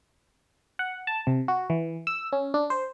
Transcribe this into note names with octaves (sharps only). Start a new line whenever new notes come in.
F#5
A5
C3
F#4
E3
E6
C#4
D4
C5